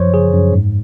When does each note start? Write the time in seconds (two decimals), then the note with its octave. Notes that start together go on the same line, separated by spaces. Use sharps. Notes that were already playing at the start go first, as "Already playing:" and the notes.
Already playing: F#2 F3 C5 C#5
0.13 C#3 G#4
0.33 F#2
0.53 G#2